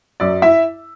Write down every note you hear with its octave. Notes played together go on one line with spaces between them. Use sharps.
F#2 F#3 D5
E4 E5